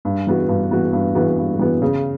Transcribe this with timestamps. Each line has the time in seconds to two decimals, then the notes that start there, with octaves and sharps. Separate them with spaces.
0.05 G2
0.27 E3 B3 F#4
0.49 G2
0.71 E3 B3 F#4
0.93 G2
1.15 E3 B3 F#4
1.38 G2
1.59 E3 B3 F#4
1.82 C#3